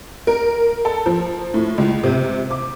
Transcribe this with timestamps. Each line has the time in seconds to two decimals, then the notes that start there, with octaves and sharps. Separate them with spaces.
0.27 A#4
0.85 A4
1.06 F3
1.54 A2
1.78 C#2
2.03 C3
2.51 D6